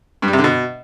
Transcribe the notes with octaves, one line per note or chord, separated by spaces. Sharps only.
G2
G3
C3
D3
B2